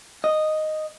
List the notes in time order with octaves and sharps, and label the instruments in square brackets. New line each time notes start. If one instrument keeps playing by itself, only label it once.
[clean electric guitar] D#5